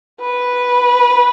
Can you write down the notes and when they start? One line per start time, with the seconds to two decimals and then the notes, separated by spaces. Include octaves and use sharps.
0.21 B4